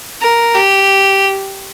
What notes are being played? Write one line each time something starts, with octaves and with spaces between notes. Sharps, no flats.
A#4
G4